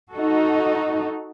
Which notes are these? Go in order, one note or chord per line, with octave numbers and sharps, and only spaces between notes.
D#4 F#4 A4